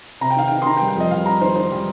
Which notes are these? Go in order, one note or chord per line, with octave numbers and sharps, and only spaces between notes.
C3 A#5
G5
D#3 F5
D#3 G5
C6
D#3 A#5
G5
G3
G5
F2 D#5
G3 F5
G3 A#5
D#3 C5
D#3 C5
G3